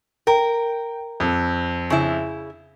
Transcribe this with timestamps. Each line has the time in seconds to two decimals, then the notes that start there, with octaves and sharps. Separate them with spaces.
0.27 A#4 G5
1.20 F2
1.90 C#3 E4